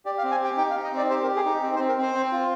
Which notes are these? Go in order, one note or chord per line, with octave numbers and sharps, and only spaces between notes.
G4 D5
F5
C4
G#5
G4 G5
D#4 G5
F5
D#4
D#5
C4 D5
G4 C5
A#4
G4
G#4
D#4
C4
C5
C4
A#4
C4 C5
C4
F4